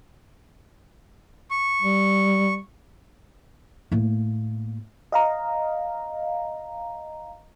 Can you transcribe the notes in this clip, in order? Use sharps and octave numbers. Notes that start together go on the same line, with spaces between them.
C#6
G3
A2 A#3
D#5 F5 A#5